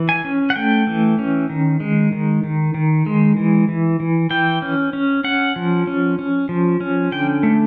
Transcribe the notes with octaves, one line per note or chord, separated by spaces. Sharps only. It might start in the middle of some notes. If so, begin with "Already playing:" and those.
Already playing: E3
G#5
C#4
F#5
A3 G5
E3
C#4
D#3
G#3
D#3
D#3
D#3
G#3
E3
E3
E3
E3 G5
C#4
C#4
C#4 F#5
F3
C#4
C#4
F3
C#4
D3 G5
A3